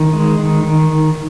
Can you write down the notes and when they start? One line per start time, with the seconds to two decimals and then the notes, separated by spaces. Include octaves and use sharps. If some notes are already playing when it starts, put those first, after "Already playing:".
Already playing: D#3
0.13 G#3
0.39 D#3
0.63 D#3